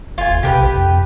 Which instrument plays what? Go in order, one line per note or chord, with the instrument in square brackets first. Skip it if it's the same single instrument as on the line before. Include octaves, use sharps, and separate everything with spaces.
[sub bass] F#1 [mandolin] F4 G#5
[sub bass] D#2
[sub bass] C3 [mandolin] G4 A#4 B4
[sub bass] A#1
F2